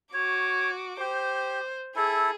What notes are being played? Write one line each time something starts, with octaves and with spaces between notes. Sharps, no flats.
F#4 C#5 D6
G4 C5
E4 G#4 A4